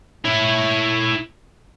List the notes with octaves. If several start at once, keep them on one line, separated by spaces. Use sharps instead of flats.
E4 C#5